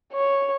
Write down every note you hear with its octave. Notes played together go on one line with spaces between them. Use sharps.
C#5